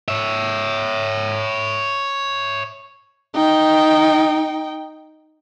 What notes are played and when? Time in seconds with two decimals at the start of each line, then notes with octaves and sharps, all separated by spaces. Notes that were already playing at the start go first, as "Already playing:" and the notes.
0.08 C#5 E5
3.34 D#4 G5